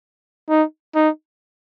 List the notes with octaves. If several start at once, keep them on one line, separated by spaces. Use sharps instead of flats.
D#4
D#4